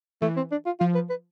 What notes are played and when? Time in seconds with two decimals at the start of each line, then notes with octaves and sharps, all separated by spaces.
0.22 E3 A3
0.37 C4
0.52 D4
0.66 F4
0.80 F3 F4
0.95 B4
1.10 B4